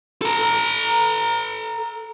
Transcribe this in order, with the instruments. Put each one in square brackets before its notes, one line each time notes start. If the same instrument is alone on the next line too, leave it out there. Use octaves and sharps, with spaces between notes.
[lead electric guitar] A4 A#5